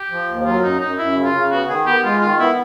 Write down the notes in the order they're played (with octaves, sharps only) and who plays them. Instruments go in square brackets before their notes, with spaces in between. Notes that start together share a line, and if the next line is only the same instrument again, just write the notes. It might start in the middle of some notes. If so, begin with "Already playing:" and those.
Already playing: [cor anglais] G4
[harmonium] F3
D#2
[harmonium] F#3 [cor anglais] F4
[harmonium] F#2 [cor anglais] D#4
[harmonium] F#2 [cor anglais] D#4
[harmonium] F#2 [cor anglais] E4
[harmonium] C#3
[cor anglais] F4
[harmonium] C#3
[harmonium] B3 [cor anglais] F#4
[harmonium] D#3 [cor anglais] G#4
[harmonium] B3 [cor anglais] G4
[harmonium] G#3 [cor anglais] F4
[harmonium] D#3 [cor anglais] F4
[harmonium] B3 [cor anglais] E4